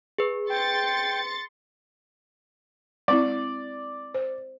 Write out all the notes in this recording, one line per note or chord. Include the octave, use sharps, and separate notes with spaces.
G#4 B4
G5 C6 A6 C#7
G#3 C4 E4 D5
C5